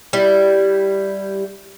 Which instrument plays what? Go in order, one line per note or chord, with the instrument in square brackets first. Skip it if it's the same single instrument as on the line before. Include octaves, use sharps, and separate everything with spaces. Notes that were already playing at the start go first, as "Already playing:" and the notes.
[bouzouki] G3 E4